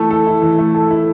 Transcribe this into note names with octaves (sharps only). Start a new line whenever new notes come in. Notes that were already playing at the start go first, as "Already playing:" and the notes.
Already playing: E3 A3 E4 A4
A4
E4
E3
A3
A4
E4